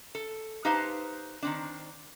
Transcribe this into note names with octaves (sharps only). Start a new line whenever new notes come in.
A4
D#4 G4 B4 C5 F5 A5
D#3 C4 D4